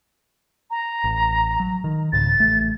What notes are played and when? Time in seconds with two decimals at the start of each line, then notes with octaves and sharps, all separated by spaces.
0.70 A#5
1.04 A1
1.60 F#3
1.84 D#3
2.13 C2 G#2 C#3 A6
2.39 A1 A3